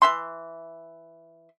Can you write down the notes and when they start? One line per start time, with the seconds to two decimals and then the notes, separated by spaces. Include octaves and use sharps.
0.02 E3 E5 C6